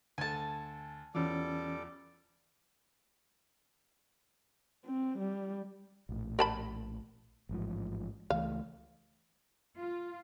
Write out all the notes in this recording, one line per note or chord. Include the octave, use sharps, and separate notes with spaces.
D2 A4 G#5 A5
E2 E3 G3 C#4 F4 A4 D6
C4
G3
A#1 A2
A#4 A5 B5
A1 G#2 F3
C#2 E3 A3 F5
F4